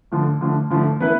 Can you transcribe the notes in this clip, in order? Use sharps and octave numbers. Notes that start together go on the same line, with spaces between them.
D3 F3 A3
D3 F3 A3
D3 F3 A3
E3 B3 E4 B4